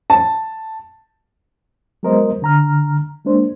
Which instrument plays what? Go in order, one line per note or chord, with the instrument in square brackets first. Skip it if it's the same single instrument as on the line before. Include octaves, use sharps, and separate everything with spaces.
[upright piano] A5
[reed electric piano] F#3 G#3 B3 A#4 C5 D#5
D3 A#5 F6
G#3 A#3 D4 C5